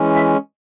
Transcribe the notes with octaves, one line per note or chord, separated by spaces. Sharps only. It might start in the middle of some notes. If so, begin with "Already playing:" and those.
Already playing: E3 G#3 C#4
E5